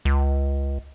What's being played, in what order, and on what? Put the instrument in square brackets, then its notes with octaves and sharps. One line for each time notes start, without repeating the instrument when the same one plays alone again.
[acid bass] C#2